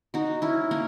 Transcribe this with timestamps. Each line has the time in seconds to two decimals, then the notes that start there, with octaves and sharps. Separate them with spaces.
0.14 D#4 F#4
0.42 C#4 E4
0.71 A#3 C#4